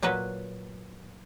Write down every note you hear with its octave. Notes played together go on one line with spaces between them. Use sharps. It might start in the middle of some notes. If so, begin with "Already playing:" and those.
A#2 F#3 F#4 B4